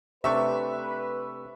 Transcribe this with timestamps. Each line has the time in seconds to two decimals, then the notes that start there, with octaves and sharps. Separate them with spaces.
0.24 C3 A3 D4 B4 E5 C#6